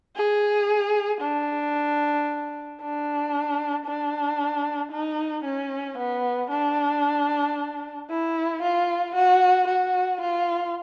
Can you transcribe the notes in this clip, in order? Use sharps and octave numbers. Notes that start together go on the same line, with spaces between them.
G#4
D4
D4
D4
D#4
C#4
B3
D4
E4
F4
F#4
F#4
F4